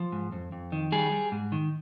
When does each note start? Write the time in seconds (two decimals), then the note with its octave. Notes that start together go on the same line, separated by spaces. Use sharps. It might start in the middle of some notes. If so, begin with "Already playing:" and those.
Already playing: F3
0.12 G#2
0.32 F2
0.52 F2
0.72 D#3
0.92 G3 G#4
1.12 G3
1.32 G#2
1.52 D#3